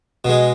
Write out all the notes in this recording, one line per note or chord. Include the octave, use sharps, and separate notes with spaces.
B2 G#3